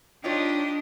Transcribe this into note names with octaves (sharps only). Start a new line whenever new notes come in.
D4 D#4 F4 G4 C#5 D#5